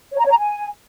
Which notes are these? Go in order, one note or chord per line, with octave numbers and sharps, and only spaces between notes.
C#5
A#5
C#5
A#5
G#5